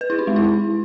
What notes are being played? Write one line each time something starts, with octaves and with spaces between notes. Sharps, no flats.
B4
E4
D#4
G#3
E4